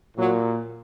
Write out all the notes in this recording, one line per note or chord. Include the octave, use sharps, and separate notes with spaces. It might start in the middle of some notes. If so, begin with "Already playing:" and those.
A#2 F#3